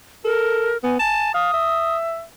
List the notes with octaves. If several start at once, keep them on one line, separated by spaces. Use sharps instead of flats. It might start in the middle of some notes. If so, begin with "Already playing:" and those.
A4 A#4
B3 G#5
G#5 A5
F5 D#6
E5